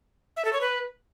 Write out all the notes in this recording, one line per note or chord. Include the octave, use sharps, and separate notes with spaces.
E5
A4
C#5
B4